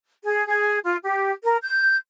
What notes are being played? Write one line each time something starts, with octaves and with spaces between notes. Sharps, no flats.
G#4
G#4
F4
G4
A#4
G6